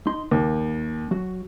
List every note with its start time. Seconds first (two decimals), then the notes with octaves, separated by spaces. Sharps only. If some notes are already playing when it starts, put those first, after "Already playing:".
0.07 D#4 C6
0.31 D#2 A#3
1.11 F#3 F#4